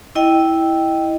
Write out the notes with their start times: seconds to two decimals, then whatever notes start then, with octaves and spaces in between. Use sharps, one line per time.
0.15 E4 D#5 G5